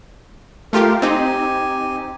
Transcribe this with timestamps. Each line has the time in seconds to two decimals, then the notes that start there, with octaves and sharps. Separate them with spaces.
0.73 A3 F4 G4 A#4
1.02 C4 D#4 G4 G#5